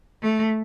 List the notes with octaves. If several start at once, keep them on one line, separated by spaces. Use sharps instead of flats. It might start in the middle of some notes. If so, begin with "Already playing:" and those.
A3